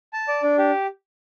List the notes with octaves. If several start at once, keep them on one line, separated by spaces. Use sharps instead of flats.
A5
D5
D4
G4